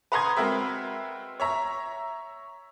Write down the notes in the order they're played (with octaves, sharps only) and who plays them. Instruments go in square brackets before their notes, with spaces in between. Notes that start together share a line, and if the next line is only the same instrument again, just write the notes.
[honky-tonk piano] B4 F#5 A#5 C6 D#6 G#6
G#3 C4 F#4 A#4 B4 E5
C#5 E5 A#5